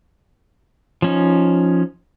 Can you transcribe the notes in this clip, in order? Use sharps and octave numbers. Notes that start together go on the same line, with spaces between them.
F3 C#4 D#4